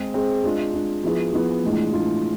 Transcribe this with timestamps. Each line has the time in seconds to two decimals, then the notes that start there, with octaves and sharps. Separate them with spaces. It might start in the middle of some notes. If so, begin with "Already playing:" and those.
Already playing: G#3 C4 G#4
0.14 G#3 C4 G#4
0.44 G#3 D4 F4
0.74 G#3 D4 F4
1.04 F3 B3 E4 G#4
1.33 F3 B3 E4 G#4
1.63 A2 E3 G#3 D4 F4
1.93 A2 E3 G#3 D4 F4